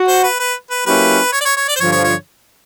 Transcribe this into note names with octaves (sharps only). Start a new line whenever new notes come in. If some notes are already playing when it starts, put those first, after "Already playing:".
Already playing: F#4
C5
B4
B4
B4
F#3 A#3 C#4 E4 G4 B4
C#5
D5
C#5
C#5
D5
C5
G2 D3 F3 C#5
C#5
C#5